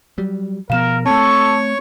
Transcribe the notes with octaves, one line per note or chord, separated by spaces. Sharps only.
F#3 G3
B2 F3 B3 A#4 F5 E7
A3 C4 A4 C#5 A5 C#6